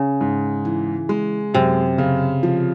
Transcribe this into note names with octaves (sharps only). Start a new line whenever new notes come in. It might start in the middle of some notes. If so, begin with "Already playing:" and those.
Already playing: C#3
G#2
E3
G#3
F#2 C3
C#3
F3